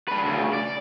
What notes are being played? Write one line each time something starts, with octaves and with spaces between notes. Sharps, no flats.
D4 B4
D2 C#3
D5